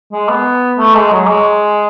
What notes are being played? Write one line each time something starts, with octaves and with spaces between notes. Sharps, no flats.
G#3
B3
A3
G#3
F#3
G#3